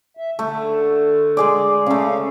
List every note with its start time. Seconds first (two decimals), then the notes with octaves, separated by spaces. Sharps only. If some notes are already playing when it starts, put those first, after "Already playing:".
0.17 E5
0.39 D3 A3
1.37 G#3 G#4 D5
1.86 C#3 A3 F5